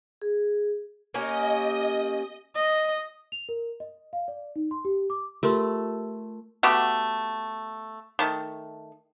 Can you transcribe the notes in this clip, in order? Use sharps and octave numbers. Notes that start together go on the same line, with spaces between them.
G#4
A#3 C#4 G4 D#5
D#5
F7
A#4
D#5
F5
D5
D#4
C6
G4
D6
A3 F4 G4 A#4 C6
A3 B3 F#4 G4
D#3 A3